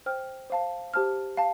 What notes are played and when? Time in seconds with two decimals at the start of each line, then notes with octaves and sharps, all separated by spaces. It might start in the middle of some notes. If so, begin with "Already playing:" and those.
0.06 C5 G5 F6
0.50 C5 F5 A5
0.94 G4 C5 A5 F6
1.37 F5 A5